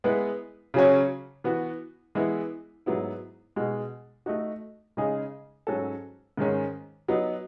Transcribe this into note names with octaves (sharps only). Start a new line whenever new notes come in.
G#3 B3 E4 B4
C#3 F#3 C#4 F#4 C#5
E3 B3 F#4
E3 G#3 B3 E4
G#2 F#3 B3 E4
B2 G#3 D#4
A3 D#4 F#4
C#3 G#3 D#4 G#4
G#2 F#3 C#4 F#4 A4
G#2 D#3 G#3 C#4
F#3 B3 D#4